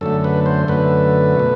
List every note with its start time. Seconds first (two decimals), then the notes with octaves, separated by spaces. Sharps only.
0.01 F#2 D3 A3 A4
0.24 B4
0.46 C5
0.68 F#2 D3 A3 B4
1.35 B2 A3